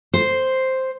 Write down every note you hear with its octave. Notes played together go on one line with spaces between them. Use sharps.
C5